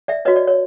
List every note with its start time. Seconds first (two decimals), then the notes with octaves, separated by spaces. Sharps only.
0.08 D5 E5
0.25 F#4 B4 C#5 D#5
0.36 D5
0.48 C#5